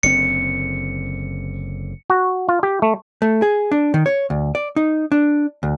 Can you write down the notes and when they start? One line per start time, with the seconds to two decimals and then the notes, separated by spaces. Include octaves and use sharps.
0.03 F#1 D3 C4 C#7
2.10 F#4
2.49 F4
2.63 G4
2.82 A3
3.22 A3
3.42 G#4
3.72 D4
3.94 D#3
4.06 C#5
4.30 D2
4.55 D5
4.76 D#4
5.12 D4
5.63 D2